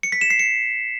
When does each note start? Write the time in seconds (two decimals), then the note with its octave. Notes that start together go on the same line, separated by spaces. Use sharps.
0.03 C#7
0.12 B6
0.21 E7
0.30 C7
0.39 C#7